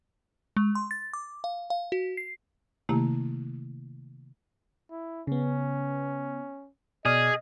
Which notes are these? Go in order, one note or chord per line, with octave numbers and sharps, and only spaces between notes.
G#3
C6
A6
D6
F5
F5
F#4
C7
C3 D#3 A3 A#3 E4 G4
E4
C#3 B3 C#4
B2 G#4 D5 D#5 F6